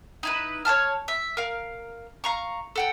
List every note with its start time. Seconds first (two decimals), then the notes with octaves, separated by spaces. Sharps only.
0.23 D#4 E4 B4
0.65 C#5 F5 A5 F6
1.08 E5
1.37 A#4 F5
2.24 F5 A#5 C#6
2.76 A4 F#5 G5